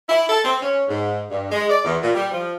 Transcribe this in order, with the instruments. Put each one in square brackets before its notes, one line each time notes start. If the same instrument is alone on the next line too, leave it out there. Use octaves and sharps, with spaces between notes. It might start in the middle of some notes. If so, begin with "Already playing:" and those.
[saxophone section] E4
A4
C4
C#4
G#2
G2
G#3
D5
E2
A#2
G3
F3